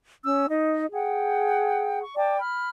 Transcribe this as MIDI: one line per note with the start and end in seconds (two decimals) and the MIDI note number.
0.24 0.46 61
0.24 0.46 88
0.49 0.87 63
0.49 0.87 75
0.92 2.02 68
0.92 2.02 78
0.92 2.02 79
2.03 2.14 85
2.17 2.39 74
2.17 2.39 79
2.17 2.39 81
2.17 2.39 86
2.39 2.68 83
2.39 2.68 89